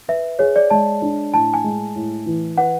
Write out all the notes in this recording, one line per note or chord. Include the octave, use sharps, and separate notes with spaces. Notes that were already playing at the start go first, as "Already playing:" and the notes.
B4 E5
G#4 C#5
D5
G#3 A5
D4
A2 A5
G#5
G#3
A2
E3
B4 F#5